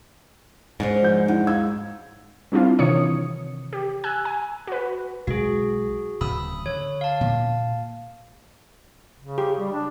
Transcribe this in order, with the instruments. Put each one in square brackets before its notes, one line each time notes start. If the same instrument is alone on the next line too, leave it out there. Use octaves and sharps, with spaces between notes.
[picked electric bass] G#2 [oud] C#4 D4 C5
[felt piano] F3 F#5 G6
[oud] E2 [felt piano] D#4 E4 F#5
[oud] F#2 [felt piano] F5 E6 G#6
[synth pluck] G3 C4 D4 E4 F4
C3 D#3 E3 C#5 D#6 C#7
G4
G#5 E6 F#6
G#5
F#4 B4
[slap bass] B1 G#3 [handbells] F#4 G#4
[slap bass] D1 C#3 [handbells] B5 D#6 E6
[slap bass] D3 [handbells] C#5
[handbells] F5 A5
[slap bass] A#2
[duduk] C#3
[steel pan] G4
[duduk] G3
D4